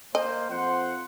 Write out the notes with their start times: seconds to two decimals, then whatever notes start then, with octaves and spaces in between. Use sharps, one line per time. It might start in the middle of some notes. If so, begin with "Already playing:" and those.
0.15 A#3 C5 D#5
0.50 F2 F4 C5 F#5 C6